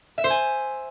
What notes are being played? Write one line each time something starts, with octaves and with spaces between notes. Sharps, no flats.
E5
C5
G#5